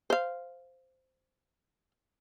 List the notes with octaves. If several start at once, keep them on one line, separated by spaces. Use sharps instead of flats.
C5 F5